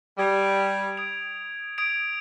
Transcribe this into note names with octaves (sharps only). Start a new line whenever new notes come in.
G3 D#6 G#6 D7 F7
D#6 G#6 D7 F7
D#6 G#6 D7 F7